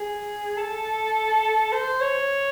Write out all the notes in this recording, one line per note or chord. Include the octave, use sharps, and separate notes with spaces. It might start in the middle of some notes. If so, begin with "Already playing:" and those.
Already playing: G#4
A4
C5
C#5